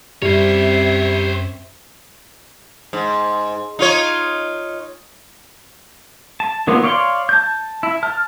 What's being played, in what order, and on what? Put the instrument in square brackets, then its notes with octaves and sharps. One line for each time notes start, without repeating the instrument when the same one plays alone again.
[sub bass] F#2 [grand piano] G3 [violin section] C4 E5 [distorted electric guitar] C5 C#5
[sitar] G#2
D#4 F4 C#5
[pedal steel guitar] A5
D#3 F#3 A#3 B3 F4
C#5 D5 F5 G5 C6
A5 G6
E4
A5 F6